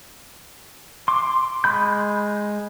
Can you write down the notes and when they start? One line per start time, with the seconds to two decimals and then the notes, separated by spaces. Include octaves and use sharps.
1.08 C6 D6
1.64 G#3 B5 G6